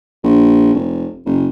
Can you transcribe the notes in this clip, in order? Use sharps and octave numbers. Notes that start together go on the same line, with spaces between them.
A#1
F1
F#1